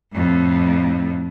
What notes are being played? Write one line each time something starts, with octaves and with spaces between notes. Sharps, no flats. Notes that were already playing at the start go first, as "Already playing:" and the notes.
F2 A2